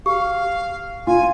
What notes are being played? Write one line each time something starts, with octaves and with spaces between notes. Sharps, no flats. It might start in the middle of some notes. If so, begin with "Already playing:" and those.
G4 F5
F4 G#5